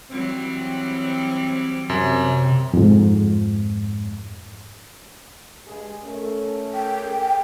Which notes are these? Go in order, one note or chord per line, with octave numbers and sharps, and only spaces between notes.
E3 F#3 G3 C4
F#2 C3
F2 G#2
G2 G#3 G#4
A3 C#4 A#4
G5
G#4